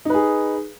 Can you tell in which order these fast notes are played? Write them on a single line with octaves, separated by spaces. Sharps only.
D#4 B4 G#4